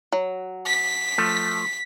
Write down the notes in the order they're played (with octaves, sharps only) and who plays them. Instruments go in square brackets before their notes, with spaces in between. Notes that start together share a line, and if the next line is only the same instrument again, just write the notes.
[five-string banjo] F#3
[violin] B6
[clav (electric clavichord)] F3 A3